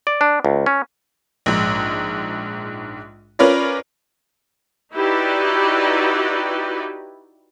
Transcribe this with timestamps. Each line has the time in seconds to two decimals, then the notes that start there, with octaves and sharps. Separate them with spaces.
0.07 D5
0.21 D4
0.45 C#2
0.66 C#4
1.46 A#1 G#2
3.39 C#4 F4 A#4 B4 C#5 D5
4.94 D#4 E4 F#4 G4 B4 D5